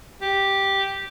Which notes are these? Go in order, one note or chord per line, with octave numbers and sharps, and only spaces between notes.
G4